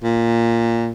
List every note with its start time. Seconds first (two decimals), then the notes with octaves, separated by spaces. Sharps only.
0.03 A#2